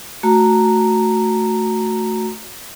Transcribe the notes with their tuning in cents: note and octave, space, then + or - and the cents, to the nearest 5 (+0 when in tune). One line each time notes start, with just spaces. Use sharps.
A3 +0 F#4 -10 A#5 -10